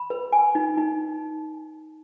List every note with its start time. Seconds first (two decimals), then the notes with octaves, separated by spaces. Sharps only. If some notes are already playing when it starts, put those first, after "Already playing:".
Already playing: B5
0.10 B4
0.32 G#5
0.55 D#4
0.78 D#4